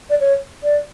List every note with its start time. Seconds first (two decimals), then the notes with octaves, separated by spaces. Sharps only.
0.10 D5
0.20 C#5
0.63 D5